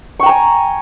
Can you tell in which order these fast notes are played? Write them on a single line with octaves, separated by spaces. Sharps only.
C#6 G5 A#5 G#5